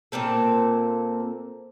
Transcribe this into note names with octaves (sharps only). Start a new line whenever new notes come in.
A#2 A#3 C4 A4